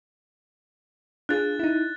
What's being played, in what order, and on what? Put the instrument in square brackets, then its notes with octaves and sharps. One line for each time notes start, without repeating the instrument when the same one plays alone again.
[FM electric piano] D4 F4 G#4 [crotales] F#6 A6
[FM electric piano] D#4 E4